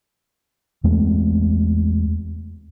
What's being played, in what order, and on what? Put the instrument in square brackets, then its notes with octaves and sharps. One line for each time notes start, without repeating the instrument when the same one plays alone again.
[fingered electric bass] E2 G#3 A3 C4